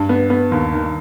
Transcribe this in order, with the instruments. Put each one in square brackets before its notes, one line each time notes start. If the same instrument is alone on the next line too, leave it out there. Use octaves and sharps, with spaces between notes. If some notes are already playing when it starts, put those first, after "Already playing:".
Already playing: [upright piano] G2
[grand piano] B3
B3
D#2
D#3